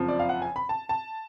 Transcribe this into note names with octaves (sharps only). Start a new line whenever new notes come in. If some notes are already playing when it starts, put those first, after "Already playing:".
Already playing: F#1 F2 F3
D5
F5
F#5
G#5
B5
A5
A5